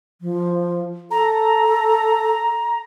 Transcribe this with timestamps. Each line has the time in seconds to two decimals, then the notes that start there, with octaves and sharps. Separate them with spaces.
0.21 F3
1.11 A4 A#5